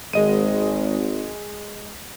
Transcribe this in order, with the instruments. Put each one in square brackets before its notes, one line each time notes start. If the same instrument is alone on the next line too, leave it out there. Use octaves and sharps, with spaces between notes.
[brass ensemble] G#1 [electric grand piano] G#3 D#5 D#7